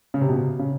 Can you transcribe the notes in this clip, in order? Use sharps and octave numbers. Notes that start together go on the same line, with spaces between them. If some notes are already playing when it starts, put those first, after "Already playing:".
C#3
C3
B2
C#3